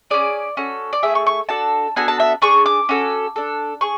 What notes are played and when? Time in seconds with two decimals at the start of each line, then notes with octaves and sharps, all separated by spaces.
0.10 C#4 G#4 D5
0.57 C#4 F#4 A4
0.93 D5
1.03 A3 E4 G#4 E5
1.15 C#6
1.27 C#6
1.49 D4 F#4 A4 A5
1.96 B3 D4 F#4 A4 G#5
2.08 A5
2.20 E5
2.42 D4 G#4 C#6
2.66 D6
2.89 C#4 F#4 A4
3.36 D4 A4
3.81 G#4 C#6